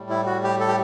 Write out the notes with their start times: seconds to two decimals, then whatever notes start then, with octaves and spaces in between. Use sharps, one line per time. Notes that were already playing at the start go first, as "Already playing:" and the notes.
Already playing: A2 G3
0.10 E4
0.26 F#4
0.44 G4
0.60 A4
0.68 G4